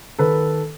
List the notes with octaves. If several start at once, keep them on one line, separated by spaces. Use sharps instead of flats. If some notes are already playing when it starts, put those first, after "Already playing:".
D#3 A4 B4